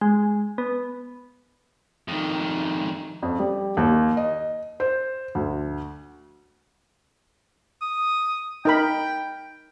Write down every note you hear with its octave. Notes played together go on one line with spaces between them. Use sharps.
G#3
B3
F2 D#3
F2
G3
D#2
D#5
C5
D2
D#6
D#4 A#4 G5 B5